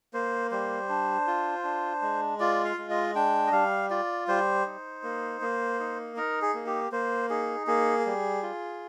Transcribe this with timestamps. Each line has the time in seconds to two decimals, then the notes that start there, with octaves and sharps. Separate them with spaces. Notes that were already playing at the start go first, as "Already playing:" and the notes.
0.14 A#3 C5
0.51 G3 C5
0.89 D4
1.27 F4
1.63 D4
2.02 G#3
2.40 F4 D5
2.64 F5
2.78 G#3
2.90 D#5
3.15 D4 G5
3.47 D#5
3.52 G3 F5
3.90 F4 D5
4.28 G3 C5
4.66 D#4
5.03 A#3
5.41 A#3
5.80 D#4
6.16 D#4 A#4
6.42 G#4
6.54 A#3
6.66 G4
6.92 A#3 C5
7.30 D#4 G#4
7.67 A#3 G#4
8.06 G3
8.42 F4